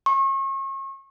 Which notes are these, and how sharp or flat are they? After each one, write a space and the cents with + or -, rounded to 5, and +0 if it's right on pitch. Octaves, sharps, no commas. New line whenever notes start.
C#6 -35